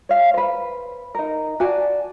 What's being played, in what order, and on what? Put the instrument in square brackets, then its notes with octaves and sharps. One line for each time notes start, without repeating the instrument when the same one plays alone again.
[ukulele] C#5 F5
B4 C5
D#4 A#4
F#4 D5 G#5 A5